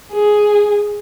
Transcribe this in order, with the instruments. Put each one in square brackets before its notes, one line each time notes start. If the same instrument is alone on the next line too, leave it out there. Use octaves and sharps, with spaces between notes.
[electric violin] G#4